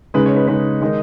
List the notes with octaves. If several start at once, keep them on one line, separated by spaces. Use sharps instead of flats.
C#3 G#3 D#4 B4
C#5
B4
C#3 G#3 D#4 B4
D#3 G#3 D#4